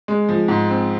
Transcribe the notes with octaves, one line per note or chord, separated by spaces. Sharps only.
G#3
F3
G#2
C4